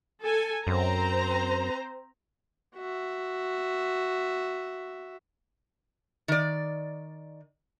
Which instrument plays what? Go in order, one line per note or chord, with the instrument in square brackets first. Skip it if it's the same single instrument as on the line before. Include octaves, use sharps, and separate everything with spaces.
[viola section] A4 G#5
[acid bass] F#2 [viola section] C4 C5 A#5
[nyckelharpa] F#4 E5
[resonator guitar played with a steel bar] D#3 D5